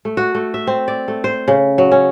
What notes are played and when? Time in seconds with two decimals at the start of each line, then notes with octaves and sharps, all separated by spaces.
0.05 A3
0.17 F#4
0.35 A3
0.54 E5
0.67 C4
0.88 D5
1.08 A3
1.24 C5
1.48 C#3
1.78 F#3
1.92 C#4